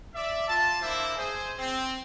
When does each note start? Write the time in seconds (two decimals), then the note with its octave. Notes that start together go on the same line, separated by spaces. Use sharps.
0.14 D5 E5
0.47 F4 A5
0.81 A#3 D4 E4 C5 E5
1.16 G#4 C5
1.58 C4